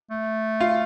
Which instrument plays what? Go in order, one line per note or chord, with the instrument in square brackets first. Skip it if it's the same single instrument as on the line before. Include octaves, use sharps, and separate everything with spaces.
[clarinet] A3
[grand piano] F4